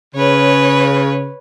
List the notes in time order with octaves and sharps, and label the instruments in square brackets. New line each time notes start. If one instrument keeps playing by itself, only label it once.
[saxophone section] C#3 [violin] B4 C#5